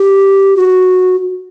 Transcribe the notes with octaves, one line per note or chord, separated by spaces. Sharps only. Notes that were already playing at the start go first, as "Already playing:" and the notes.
Already playing: G4
F#4